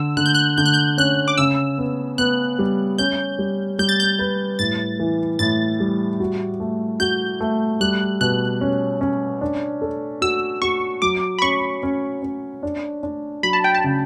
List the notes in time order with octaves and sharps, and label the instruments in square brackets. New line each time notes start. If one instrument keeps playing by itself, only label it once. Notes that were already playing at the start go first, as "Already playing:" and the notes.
Already playing: [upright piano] D3 [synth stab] E6
[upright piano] D3 [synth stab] F#6
[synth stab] G6
F#6
[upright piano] D3 [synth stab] G6
[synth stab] F#6
G6
[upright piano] C#4 [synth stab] F#6
[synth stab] D6
[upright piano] C#3 [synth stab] E6
[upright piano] B3
[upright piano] B3 [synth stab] F#6
[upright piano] G3
[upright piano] C#4 [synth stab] G6
[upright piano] G3
[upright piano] G3 [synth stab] G6
[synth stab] A6
G6
[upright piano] B4
[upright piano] A2 [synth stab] A6
[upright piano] E3
[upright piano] A2 [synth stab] A6
[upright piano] G3
F#4
A3
[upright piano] F#4 [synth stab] G6
[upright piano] A3
[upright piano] G3 [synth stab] F#6
[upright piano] B2 [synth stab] F#6
[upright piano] C#4
C#4
D4
A4
[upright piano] F#4 [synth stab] E6
[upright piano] F#4 [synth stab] C#6
[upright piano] F#3 [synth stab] D6
[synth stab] B5
[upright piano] C#4 [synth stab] C#6
[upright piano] C#4
C#4
D4
D4
[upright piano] F#3 [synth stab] B5
[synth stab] A5
G5
A5
[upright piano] C#3